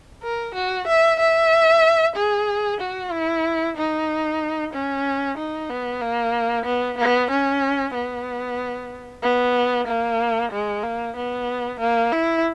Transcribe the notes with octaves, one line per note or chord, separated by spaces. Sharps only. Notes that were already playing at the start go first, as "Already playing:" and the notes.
A#4
F#4
E5
E5
G#4
F#4
E4
D#4
C#4
D#4
B3
A#3
B3
B3
C#4
B3
B3
A#3
G#3
A#3
B3
A#3
E4